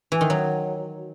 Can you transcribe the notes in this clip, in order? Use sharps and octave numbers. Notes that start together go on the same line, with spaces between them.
E3
D#3
F#3